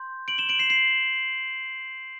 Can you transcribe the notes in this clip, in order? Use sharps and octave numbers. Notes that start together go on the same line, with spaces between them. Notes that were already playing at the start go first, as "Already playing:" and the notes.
Already playing: C6 G6
D7 F#7
E7 G7
D7 F#7
C7 E7
C7 E7